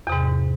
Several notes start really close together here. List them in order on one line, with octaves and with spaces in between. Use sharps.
E2 C3 G#2